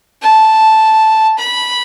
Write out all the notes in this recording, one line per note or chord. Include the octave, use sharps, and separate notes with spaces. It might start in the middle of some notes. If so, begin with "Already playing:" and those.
A5
B5